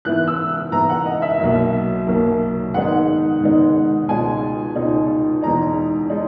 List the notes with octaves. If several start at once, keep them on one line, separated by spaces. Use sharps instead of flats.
G#2 E3 B3 E4 F#6
E6
G#2 E3 B3 E4 A#5
F#5
D#5
E5
B1 B2 F#3 A#3 E5
B1 B2 F#3 A#3
G#2 D#3 G#3 B3 D#4 F#5
G#2 D#3 G#3 B3 D#4
C#2 B2 G#3 D#4 G#5
C#2 B2 G#3 D#4
E2 B2 G#3 D#4 A#5
G#3 D#4